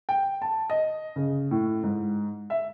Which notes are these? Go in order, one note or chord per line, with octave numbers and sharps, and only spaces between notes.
G5
A5
D#5
C#3
A2
G#2
E5